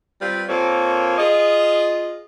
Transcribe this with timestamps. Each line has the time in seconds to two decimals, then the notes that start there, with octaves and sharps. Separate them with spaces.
0.22 G3 C4 F4 B4
0.49 A#2 A#3 C4 A4 C#5
1.18 F4 G#4 D#5